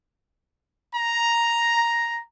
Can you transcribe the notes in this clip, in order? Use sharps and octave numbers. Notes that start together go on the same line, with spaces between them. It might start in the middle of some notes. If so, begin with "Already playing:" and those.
A#5